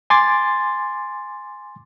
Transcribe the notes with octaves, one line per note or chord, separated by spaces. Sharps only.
G#5 C6 D6 A6